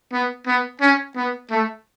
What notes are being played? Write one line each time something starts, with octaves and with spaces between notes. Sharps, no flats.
B3
B3
C#4
B3
A3